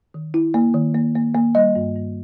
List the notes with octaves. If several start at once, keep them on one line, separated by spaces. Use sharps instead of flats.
D#3
E4
A#3
D#3
A#3
A#3
A#3
G3 D#5
G2
G2